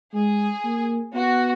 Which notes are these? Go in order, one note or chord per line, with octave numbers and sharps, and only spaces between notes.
G#3 G#4
A#3
B3 F#4